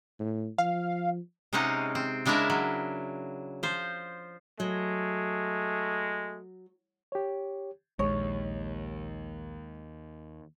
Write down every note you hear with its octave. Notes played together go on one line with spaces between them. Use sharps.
A2
F3 F5
C3 G#3 C4 C#4 D#4 F#5
C4
C#3 G#3 D4 E4 A#4 E5
F#3
F3 C5
F#3 G#3 A3
G4 C#5
A#1 D#2 G#3 C#5